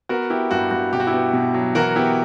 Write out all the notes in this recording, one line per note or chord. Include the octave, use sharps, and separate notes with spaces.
B3 F#4 A#4
B3 E4 G4
G2 F#4
G2 F#4
B2 G4
F#4
E4 G4
B3
B2
F#3
E3 F#4 A#4
B3 E4 G4